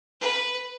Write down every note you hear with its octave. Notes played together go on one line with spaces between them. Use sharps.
B4